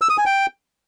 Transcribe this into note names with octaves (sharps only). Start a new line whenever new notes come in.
E6
D#6
G#5
G5